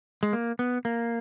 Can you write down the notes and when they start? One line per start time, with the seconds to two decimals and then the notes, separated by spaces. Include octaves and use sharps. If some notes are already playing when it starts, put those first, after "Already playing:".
0.23 G#3
0.33 A#3
0.59 B3
0.85 A#3